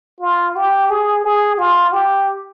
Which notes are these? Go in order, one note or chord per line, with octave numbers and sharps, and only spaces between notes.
F4
G4
G#4
G#4
F4
G4